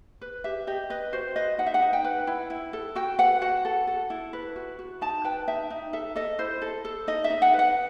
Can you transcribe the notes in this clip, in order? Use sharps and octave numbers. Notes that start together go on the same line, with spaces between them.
B4
G4 E5
G4 D#5
B4 D#5
F#4 C5
B4 D#5
D#4 F#5
E5
F#5
D#4
G5
B4
E4
E4
A4
F#4 G5
B4 F#5
F#4 F#5
A4
A4
E4
B4
F#4
F#4
D#4 A5
B4 G5
D#4 E5
D#4
A4 E5
A4 D#5
E4 C5
A4
A4
D#4 D#5
E5
D#4
F#5
B4
F#5